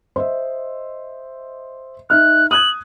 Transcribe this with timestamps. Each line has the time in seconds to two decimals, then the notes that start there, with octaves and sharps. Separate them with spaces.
0.16 C5 D#5 E5
2.10 D#4 E5 F6 F#6
2.51 D#6 F#6 G#6 F#7